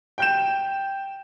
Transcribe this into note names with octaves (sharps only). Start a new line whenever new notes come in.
G5 G6 E7